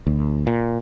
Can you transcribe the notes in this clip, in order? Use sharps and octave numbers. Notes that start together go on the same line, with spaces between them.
D2
A#2